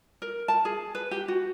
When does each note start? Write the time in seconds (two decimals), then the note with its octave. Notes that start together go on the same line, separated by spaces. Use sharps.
0.22 A#4
0.48 A5
0.65 G#4
0.95 B4
1.11 G4
1.28 F#4